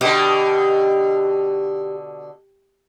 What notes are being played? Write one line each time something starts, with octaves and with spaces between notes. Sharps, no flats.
B2 D3 G4